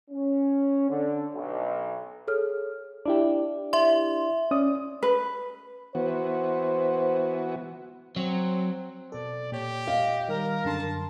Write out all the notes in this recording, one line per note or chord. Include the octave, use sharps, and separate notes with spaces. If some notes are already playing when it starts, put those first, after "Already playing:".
C#4
D3
B1
G#4 A4 C#5 F6
D4 E4 G4 D5
E5 C6
C#4 D5 D#6
B4
E3 B3 F#4 C5
F#3 C4
B2 A4 D5
A#2 G4 C#5
D#5 F5
D#3 G3 A#4 F6
F#2 D3 A5 C6